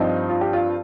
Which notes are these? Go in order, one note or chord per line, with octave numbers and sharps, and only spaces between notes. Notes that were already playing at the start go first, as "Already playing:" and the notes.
Already playing: G2 F3 C4 D#4
F4
G4
F4